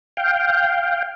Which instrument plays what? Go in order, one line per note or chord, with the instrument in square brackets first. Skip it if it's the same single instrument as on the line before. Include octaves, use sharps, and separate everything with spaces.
[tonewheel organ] F5 G5